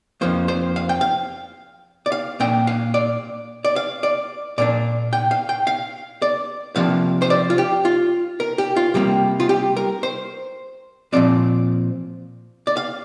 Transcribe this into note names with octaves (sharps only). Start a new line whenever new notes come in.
F2 F3 A#3 C5
C5
F5
G5
F5
D5
F5
A#2 A#3 D4 G5
F5
D5
D5
F5
D5
A#2 A#3 D4 D5
G5
F5
G5
F5
D5
C3 F3 A#3 D4 F5
C5
D5
F4
G4
F4
A#4
G4
F4
C3 G3 A#3 G4
F4
G4
A#4
C5
A#2 F3 C4 D5
D5
F5